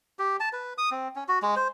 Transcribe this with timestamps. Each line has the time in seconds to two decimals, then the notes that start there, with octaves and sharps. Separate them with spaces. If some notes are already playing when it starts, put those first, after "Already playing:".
0.19 G4
0.40 A5
0.53 B4
0.78 D#6
0.91 C4
1.16 C#4
1.28 F#4
1.42 G#3
1.56 C5